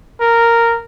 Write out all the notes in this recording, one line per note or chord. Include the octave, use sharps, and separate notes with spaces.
A#4